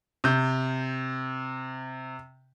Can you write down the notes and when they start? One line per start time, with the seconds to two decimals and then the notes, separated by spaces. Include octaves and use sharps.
0.24 C3 G6